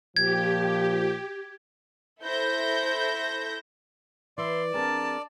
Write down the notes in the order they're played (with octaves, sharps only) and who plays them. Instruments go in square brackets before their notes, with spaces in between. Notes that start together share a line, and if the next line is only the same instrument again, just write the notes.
[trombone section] A#2 F3 [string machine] G4 [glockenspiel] G#6
[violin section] E4 A4 C5 G6 A#6
[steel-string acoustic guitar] E3 [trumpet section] E4 E5 C6 [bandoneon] D5
[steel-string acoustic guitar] C4 D4 G#4 [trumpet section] A#4 [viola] A5